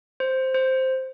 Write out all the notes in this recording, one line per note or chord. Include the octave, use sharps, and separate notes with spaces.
C5
C5